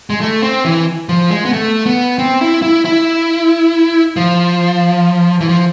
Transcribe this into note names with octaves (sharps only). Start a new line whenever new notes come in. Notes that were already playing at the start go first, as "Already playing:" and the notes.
G#3
A3
C4
E3
F3
G#3
B3
A3
B3
C4
E4
E4
E4
F3
E3
F3